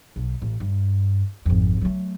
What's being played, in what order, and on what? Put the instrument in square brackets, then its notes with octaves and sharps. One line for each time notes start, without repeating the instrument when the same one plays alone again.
[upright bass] B1
A1
G2
G#1 F2
F#3 A3